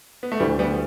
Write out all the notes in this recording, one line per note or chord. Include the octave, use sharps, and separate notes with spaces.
B3
A3
D2 E3 G3
G3 B3